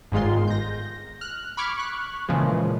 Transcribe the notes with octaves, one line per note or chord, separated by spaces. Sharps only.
G1 G#2 D#3 G#3 F4 C6
G6 A#6
F6 F#6
B5 C#6 D6 F6 G#6
C#6 F#6
A#2 C#3 E3 F3 G#3